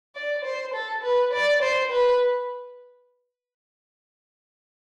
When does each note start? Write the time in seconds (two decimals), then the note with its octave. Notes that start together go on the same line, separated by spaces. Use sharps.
0.15 D5
0.45 C5
0.74 A4
1.04 B4
1.33 D5
1.62 C5
1.92 B4